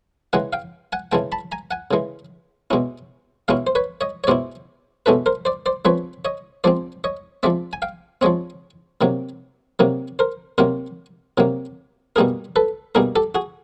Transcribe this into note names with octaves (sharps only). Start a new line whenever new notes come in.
C#3 E3 G#3 F#5 G#5
F5 G5
F#5 G#5
C#3 E3 G#3 G5 A5
A5 B5
G#5 A#5
F#5 G#5
C#3 E3 G#3
B2 G#3 C#4 E4
B2 G#3 C#4 E4 F5 G5
C5
B4 C#5
C#5 D#5
C#5
B2 G#3 C#4 E4 C5 D5
B2 G#3 C#4 E4 A4 B4
A#4 C5
C5 D5
C5 D5
F3 G#3 C4 B4 C#5
C#5 D#5
F3 G#3 C4 C5 D5
C#5 D#5
F3 G#3 C4 D5 E5
G#5
F5 G5
F3 G#3 C4 C#5 D#5
C3 D#3 F#3 A#3
C3 D#3 F#3 A#3
A#4 C5
C3 D#3 F#3 A#3 A#4 C5
C3 D#3 F#3 A#3
B2 G3 A#3 D#4 G#4 A#4
A4 B4
B2 G3 A#3 D#4 G#4 A#4
G4 A4
F#4 G#4